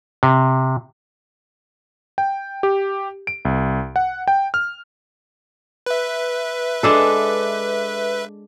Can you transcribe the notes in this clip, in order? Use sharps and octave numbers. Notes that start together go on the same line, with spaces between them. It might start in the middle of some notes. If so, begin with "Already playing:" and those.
C3
G5
G4
D7
C2
F#5
G5
F6
B4 E5
G#3 D4 A4